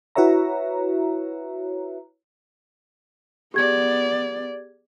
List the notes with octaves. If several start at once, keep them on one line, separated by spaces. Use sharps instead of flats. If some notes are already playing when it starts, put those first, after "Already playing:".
E4 F#4 B4 C#5 E5 A#5
B3 G4 G#4 D5 G#6